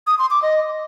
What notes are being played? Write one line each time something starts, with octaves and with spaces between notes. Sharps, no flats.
D#6
C6
D6
D#5